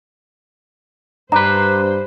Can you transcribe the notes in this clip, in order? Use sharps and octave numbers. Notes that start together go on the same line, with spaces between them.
G2 D4 B4 C5 A#5